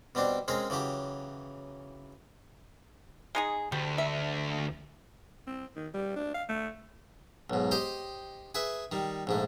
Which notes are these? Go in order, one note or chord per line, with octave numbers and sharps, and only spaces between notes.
B2 G3 C4 D4
G#3 C4 C#4 G#4 A#4
C#3 E3 F#3 G4
G#3 D#4 G#4
D2 G3
E5
C4
D#3
G3
D4
F5
A3
B1 G#2
G4 C5 D#5 G5
G#4 B4 E5
D#3 G3
A#1 G#2 A3